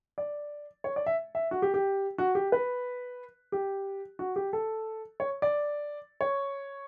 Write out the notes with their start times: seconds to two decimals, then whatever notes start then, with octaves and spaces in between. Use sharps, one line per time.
0.18 D5
0.84 C#5
0.96 D5
1.06 E5
1.35 E5
1.51 F#4
1.62 G4
1.74 G4
2.18 F#4
2.35 G4
2.52 B4
3.52 G4
4.19 F#4
4.36 G4
4.53 A4
5.20 C#5
5.42 D5
6.21 C#5